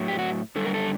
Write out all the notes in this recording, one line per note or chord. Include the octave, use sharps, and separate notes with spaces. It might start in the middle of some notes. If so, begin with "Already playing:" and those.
Already playing: A2 F#3
G4
F#4
F#2 D3 G3 A4
A#4
A4